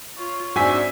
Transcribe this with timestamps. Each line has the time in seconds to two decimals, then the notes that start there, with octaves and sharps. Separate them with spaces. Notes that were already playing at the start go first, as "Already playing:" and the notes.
0.18 F4 C#5
0.56 G#2 C4 D4 F#4 E5 G#5 B6